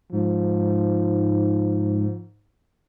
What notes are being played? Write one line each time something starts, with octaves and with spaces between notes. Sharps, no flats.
G#2 F3